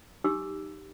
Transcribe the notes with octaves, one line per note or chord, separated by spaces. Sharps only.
D#4 G4 D6 E6